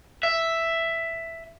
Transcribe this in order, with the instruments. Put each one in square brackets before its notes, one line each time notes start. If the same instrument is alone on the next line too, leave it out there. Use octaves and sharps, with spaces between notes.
[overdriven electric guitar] E5